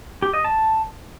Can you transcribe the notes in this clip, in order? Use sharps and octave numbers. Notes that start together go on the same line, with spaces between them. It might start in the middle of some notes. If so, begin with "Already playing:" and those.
G4
D#5
A5